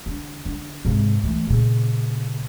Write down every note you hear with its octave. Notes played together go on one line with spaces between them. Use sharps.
D3
D3
G#2 C3
E3 A3
A#2 C#3